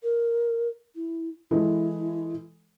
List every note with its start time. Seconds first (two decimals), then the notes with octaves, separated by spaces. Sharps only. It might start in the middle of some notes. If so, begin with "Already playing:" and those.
0.03 A#4
0.95 E4
1.51 E3 G#3 E4 A4